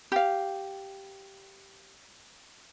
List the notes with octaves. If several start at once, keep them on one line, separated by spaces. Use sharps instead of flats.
G4 F5